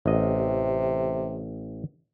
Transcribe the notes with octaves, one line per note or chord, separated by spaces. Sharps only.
A1 C3 D#5